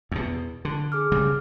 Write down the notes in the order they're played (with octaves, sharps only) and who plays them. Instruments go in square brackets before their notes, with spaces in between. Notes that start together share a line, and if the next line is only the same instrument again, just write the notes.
[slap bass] E2 B2
D3
[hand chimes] G#4 D6 F6
[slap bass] C#3 G3